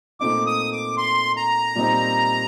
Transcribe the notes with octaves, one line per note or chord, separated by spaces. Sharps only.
A#2 A3 C4 D#4 D6
D#6
D6
C6
A#5
A#2 G3 C4 D#4